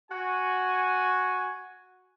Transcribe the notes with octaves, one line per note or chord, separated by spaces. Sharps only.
F#4 G#5